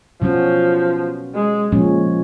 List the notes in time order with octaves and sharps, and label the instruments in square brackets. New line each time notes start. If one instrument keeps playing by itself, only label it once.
[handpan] B2 F#3 C#4 F#4 [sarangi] F3
[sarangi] G#3
[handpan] A#2 F3 G#3 C#4